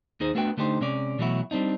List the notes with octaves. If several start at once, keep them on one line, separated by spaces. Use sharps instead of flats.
D#2 D#4 G#4 C5
A3 B3 D4 F#4 B4 G5
D3 A3 D4 D#4 G4 C5
C3 G#3 C#4 D5
B2 E3 F#3 A3 E4 F#4
G3 C4 D4 D#4